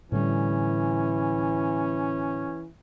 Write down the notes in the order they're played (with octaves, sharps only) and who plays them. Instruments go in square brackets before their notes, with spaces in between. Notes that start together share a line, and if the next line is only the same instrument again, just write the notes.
[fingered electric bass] A2 D3 G3 [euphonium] E3 [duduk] C#4